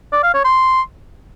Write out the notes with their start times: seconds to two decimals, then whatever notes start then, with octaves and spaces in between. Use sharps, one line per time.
0.12 D5
0.23 F5
0.34 C#5
0.45 C6